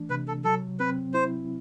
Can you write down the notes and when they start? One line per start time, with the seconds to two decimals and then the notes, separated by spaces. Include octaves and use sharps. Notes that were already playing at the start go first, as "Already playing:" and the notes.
Already playing: E3 A3 D4
0.10 C3 B4
0.28 A4
0.44 F#3 A4
0.80 C4 B4
1.13 E4 C5